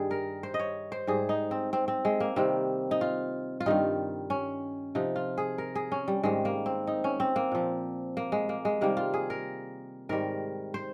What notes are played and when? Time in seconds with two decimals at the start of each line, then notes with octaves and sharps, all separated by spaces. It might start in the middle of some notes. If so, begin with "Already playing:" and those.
Already playing: G2 D#3 G3 G#4
0.11 A#4
0.43 C5
0.54 D#5
0.59 C#5
0.92 C5
1.07 G#2 G3 G#4
1.29 D#4
1.51 C4
1.73 C4
1.88 C4
2.05 G#3
2.20 A#3
2.36 C3 D#3 G3 C4
2.91 D#4
3.01 F4
3.60 F4
3.66 G2 D#3 G3 D#4
4.30 C#4
4.95 C3 F3 D#4
5.16 F4
5.38 G#4
5.58 A#4
5.75 G#4
5.92 C#4
6.08 G3
6.23 G#2 D#3 G3 G#3
6.45 A#3
6.66 C4
6.87 D#4
7.04 C#4
7.20 C4
7.36 A#3
7.52 A#2 F3
8.17 A#3
8.32 G#3
8.49 A#3
8.65 G#3
8.81 C3 D#3 G3 A#3
8.97 F4
9.14 G#4
9.30 A#4
10.09 G#2 D#3 G3 A#4
10.74 C5